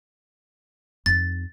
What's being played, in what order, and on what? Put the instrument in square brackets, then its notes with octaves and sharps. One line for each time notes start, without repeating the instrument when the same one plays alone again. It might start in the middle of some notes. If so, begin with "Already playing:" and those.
[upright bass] F2 D#4 [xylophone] A6